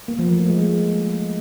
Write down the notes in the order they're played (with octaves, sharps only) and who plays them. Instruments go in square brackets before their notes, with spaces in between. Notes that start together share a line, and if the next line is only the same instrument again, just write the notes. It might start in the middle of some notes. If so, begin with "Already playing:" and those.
[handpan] A#3
F3
A3
F3
G#3